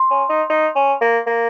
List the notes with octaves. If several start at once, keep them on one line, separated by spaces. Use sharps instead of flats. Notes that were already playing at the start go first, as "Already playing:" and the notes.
Already playing: C6
C#4
D#4
D#4
C#4
A#3
A#3